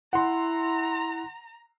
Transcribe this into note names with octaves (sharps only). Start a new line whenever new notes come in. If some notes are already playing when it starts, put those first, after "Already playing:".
E4 F#5 A#5 C6